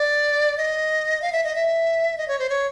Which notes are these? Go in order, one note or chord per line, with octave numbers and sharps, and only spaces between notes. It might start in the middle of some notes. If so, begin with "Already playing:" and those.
Already playing: D5
D#5
F5
E5
D#5
E5
D#5
C#5
C5
C#5